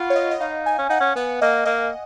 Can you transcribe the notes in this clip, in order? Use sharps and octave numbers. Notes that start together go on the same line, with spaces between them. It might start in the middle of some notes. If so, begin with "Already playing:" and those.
Already playing: F4 F#5 B5 C#6
C#5
D#5
D#5
D#4 F5
G#5
C#4
D#4 F#5
C#4
B3 F#5
A#3 D#5
A#3 D#5